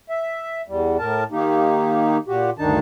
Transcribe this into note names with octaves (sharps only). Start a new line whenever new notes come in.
E5
E2 G3
A2 A#4 A5
D#3 A#3 D#4 G4
A#2 F#4 G4
D2 G2 D#3 D4 D#4 A5